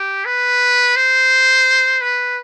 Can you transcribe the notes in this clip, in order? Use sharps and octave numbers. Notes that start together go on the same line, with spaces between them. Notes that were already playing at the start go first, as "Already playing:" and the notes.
Already playing: G4
B4
C5
B4